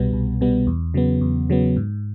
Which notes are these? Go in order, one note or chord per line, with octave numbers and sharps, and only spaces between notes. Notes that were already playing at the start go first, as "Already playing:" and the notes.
Already playing: C2 B2 G3 B3
C2
B2 G3 B3
E2
C#3 F#3 B3
E2
C#3 F#3 B3
G#2